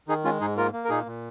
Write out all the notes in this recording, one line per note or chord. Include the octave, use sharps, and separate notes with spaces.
D#3 D#4 G#4
G#3 C#4 F4
G#2 D#4 G#4
A#3 F4 A#4
A#3
A#4
A#2 D#4 G#4
A#2